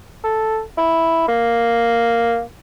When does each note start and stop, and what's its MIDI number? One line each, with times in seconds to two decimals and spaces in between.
0.24 0.60 69
0.77 1.24 64
1.28 2.41 58